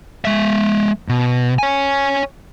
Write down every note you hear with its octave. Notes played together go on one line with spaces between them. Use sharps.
G#3 E5
B2
C#5 G#5